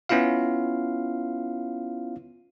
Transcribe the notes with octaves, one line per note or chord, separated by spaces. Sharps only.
B3 C#4 E4 F4 F5